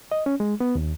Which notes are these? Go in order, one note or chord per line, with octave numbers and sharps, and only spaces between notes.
D#5
C#4
G#3
B3
D#2